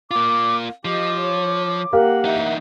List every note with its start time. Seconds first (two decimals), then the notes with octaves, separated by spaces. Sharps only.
0.11 A#3 F4 D6
0.85 F3 G4 D#5 D6
1.20 C#5
1.93 A#3 G4 A#4 F5 F#5
2.25 E3 D#4 E5